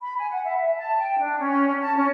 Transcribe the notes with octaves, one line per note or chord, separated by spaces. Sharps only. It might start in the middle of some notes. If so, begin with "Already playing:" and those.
B5
G#5
F#5
E5
E5
A5
G5
D4
C#4
A5
C#4